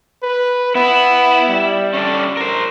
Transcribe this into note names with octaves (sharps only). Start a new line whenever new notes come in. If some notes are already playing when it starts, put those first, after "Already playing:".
B4
B3 E4
G3
C#4 D4 A4
A#4 C5